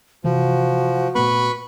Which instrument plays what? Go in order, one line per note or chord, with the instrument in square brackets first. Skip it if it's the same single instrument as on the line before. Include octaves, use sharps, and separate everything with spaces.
[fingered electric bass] C3 E3 [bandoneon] F3 [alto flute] F#4
[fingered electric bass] A#2 A3 B3 [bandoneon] B4 B5 C#6